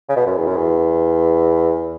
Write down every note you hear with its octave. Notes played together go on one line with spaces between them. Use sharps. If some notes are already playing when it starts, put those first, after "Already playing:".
C#3
B2
F#2
E2
F#2
E2